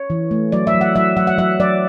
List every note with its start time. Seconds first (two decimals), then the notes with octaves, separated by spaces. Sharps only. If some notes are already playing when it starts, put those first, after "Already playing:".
Already playing: C#5
0.10 E3
0.31 A3
0.52 F#3 D5
0.67 E5
0.74 F#3
0.81 F#5
0.95 F#3 E5
1.17 F#3 F#5
1.27 F#5
1.38 F#3 E5
1.60 F#3 D5